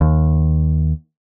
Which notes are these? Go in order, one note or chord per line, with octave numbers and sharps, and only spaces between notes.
D#2